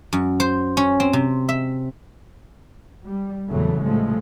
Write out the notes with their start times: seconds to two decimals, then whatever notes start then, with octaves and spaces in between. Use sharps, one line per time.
0.13 F#2
0.40 C5
0.77 C#4
1.00 C4
1.13 C3
1.49 E5
3.05 G3
3.50 E2 A#2 C#3 E3 F#3 A3
3.81 C2 A2 F3 G#3 A3